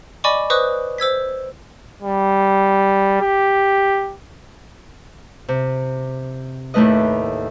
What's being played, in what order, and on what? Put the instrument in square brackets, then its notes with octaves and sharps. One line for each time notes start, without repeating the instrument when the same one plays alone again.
[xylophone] D5 D#5 G#5 B5 C#6 D6
B4 C5 D#5 C#6 D#6 F#6
C5 E6 G#6 B6
[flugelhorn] G3
G4
[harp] C3
D#2 A2 A3 B4 D#5